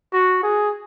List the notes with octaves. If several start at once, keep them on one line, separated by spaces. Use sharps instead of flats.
F#4
G#4